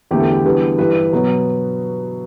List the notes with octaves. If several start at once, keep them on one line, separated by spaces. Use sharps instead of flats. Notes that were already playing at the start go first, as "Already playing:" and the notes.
E2 D3 A3 G4
A4
G4
E2 D3 G3 B3
G2 E3 G3 B4
B2 F#3 B3